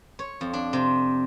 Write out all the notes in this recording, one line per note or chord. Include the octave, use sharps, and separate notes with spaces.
C#5
F2
D4
C3